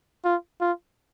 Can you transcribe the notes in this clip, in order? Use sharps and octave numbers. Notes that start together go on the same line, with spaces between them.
F4
F4